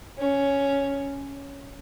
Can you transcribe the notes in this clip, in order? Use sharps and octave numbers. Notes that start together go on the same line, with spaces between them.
C#4